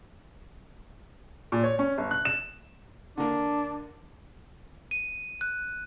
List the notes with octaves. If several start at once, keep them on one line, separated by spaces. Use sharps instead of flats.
A#2
C#5
C#4
G1
F#6
E7
D3 A#3 D4
D#7
F#6